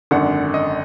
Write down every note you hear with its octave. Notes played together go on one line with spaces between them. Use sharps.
G#1 F#2 D3 F#5
D#5